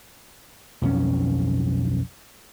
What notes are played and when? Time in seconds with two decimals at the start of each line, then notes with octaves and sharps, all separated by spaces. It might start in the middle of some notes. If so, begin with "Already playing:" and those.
0.82 B1 F2 G3 C#4